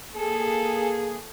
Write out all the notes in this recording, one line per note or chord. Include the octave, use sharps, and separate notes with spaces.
A#3 G#4 A4